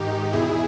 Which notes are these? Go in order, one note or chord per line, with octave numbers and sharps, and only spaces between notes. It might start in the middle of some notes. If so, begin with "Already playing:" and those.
Already playing: G#2 D#3 D#4 G4
E2 B2 E4 G#4